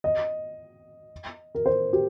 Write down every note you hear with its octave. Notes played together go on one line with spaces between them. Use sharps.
D#5
A#4
C5
G4